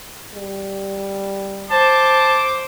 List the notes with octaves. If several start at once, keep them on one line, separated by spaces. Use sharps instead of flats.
G3
C5 A5 D6